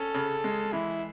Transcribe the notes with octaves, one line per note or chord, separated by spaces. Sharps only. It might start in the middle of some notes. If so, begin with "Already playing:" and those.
Already playing: C#4 A4
C#3
G#3
E3 E4